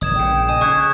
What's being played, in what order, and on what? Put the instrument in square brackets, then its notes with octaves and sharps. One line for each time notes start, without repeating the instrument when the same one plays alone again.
[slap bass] G1 [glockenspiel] D#6 G#6 E7
[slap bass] A#1 C#3 [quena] G5
[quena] D#5 [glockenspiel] G#5 D#6 E7
[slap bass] C#3 [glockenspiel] C#6 D#6 F#6 [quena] G#6